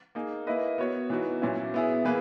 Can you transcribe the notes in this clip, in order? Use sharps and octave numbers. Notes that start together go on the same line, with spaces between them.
A#3 D#4 G#4
A#3 E4 B4 D#5
B3 F#4 C#5
E3 B3 D#4 F#4
A#2 F#3 C#4 E4
B3 E4 G#4
E3 A#3 G#4 B4